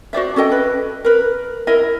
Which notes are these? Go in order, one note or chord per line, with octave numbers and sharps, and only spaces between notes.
F#4 C5 D5 E5
C#4 A4 D#5 G5
B4
A#4 B4
E4 A#4 D#5 E5